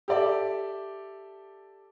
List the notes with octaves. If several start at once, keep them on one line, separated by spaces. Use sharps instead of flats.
G4 A4 D5 E5